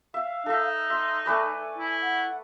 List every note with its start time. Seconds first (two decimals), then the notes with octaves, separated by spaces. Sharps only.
0.14 E5 F5
0.46 D#4 A4 E5
0.90 E5 C6
1.26 A3 B4 D5 G#5
1.78 E4
2.01 F#5